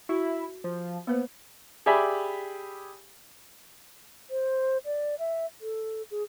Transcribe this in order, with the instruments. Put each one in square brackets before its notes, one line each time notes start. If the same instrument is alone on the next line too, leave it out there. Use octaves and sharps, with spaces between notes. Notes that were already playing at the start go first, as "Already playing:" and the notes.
[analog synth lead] E4 [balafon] F#4
[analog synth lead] F3
[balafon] A#3 B4 C5 [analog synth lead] B3
[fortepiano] G4 G#4 D5 E5 G#5 B5
[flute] C5
D5
E5
A4
G#4